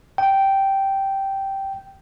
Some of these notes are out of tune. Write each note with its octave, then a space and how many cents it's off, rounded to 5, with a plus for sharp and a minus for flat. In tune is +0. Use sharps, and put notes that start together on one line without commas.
G5 -10